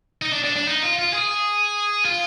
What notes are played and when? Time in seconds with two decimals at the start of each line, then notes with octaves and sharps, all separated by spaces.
0.22 D#4
0.33 D4
0.44 D4
0.56 D4
0.68 D#4
0.83 F4
0.99 F4
1.13 G#4
2.05 F4